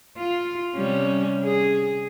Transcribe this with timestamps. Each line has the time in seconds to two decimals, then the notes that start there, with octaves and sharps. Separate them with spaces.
0.17 F4
0.75 C3 G3 C#4
1.44 G#4